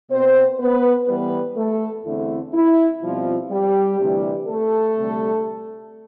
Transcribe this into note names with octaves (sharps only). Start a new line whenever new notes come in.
B2 B3 C4 C5
B3 B4
A2 E3 G3 B3 B4
A3 A4
E2 D3 A3 C4 E4
E4
B2 F3 G3 C4 F4
G3 G4
D2 C3 E3 G3
A3 A4
D2 C3 G3